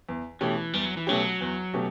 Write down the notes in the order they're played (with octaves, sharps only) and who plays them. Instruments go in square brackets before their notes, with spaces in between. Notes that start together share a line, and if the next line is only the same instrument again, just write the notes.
[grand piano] E2
[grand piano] B2 A3 C#4 G4 [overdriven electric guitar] E3
[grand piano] E2 [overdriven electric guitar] G3
[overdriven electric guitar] F#3
E3
[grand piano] B2 A3 C#4 G4 [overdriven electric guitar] F#3
[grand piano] E2
B2 A3 C#4 G4